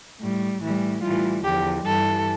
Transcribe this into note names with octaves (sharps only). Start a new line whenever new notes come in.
A2 G3
A2 E3 G3
A2 E3 G3 F4
E2 D3 F3 G4
G2 E3 G3 A4